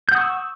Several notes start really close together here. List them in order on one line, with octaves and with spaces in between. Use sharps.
G6 F#5 D#6 C#6 E6